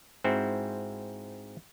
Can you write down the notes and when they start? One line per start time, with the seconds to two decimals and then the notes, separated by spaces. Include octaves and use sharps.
0.24 G#2 C4 E4 F#4